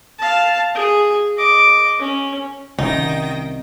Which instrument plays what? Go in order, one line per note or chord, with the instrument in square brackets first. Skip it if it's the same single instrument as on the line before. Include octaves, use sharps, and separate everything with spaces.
[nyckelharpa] F5 A5
G#4
D#5 D6
C#4
[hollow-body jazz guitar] C2 [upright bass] C3 C#4 [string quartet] D#3 G5 A#6 [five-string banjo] D#4